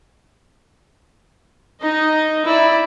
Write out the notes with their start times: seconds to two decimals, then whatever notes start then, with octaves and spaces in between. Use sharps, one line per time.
1.81 D#4 D#5
2.45 E4 D5